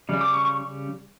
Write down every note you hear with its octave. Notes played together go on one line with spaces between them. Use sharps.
C#3 G3
D6
C#6
C#6